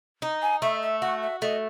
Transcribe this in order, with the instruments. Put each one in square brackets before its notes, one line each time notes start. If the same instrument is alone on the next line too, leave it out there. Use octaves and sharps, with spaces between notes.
[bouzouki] D#4
[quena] G#5
[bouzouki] A3 [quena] E5
[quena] E5
[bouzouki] F#4 [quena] F#5
[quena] E5
[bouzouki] A3 [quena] D#5